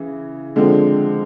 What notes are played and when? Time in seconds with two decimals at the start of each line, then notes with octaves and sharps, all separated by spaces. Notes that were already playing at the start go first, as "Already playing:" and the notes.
Already playing: C#3 E3
0.56 D3 F3 G#3 C4